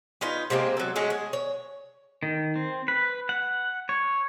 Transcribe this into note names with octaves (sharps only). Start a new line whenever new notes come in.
C#4 D#4 F4 B4
C3 G#3 A#3 C4
F#3 A4
G#3 A3 C#4 F#4
G#4
C#5
D#3
C4
B4
F#5
C#5